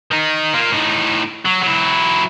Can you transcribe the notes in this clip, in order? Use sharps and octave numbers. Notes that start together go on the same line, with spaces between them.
D#3 D#4
A#3 F4
A2 D#4
F#3
F#3 E4